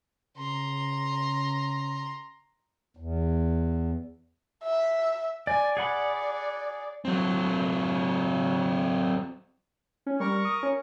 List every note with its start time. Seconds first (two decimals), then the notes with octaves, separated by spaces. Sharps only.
0.38 C#3 A#5 C6
2.97 E2
4.63 E5
5.47 D5 G#5
5.77 G#4 D5 F#5 B5
7.05 F#3 C4
10.06 C#4
10.20 G3 A#4 C#6
10.45 D#6
10.63 C#4